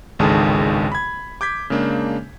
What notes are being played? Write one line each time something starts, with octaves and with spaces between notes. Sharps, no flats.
G#1 C#2 D3 D#3 G#4 A5
B5 G#6
D6 G6 G#6 B6
C#3 G#3 A#3 D4